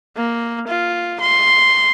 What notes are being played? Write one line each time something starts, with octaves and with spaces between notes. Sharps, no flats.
A#3
F4
C6